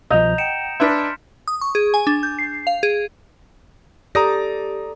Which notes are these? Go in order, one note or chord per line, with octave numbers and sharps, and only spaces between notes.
C2 B2 F3 D#5 A#5 G6 F7
F#5 G5 C#7 D7 E7
D4 B4 E5 C6 F6 G#6 B6
D#6
C#6
G#4
G#5
D4
G6
C7
F5
G#4
G4 A4 D5 A#5 D#6 A#6